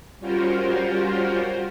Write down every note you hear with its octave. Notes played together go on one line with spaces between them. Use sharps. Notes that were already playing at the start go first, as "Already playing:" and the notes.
G3 C#4 F4 F#4 A#4 C5